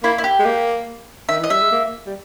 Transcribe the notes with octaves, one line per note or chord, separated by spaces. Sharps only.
A#3 E4
E4
G4
G#3
A#3
D#3 E5
E3 D#5
G3 E5
G#3
A#3
G3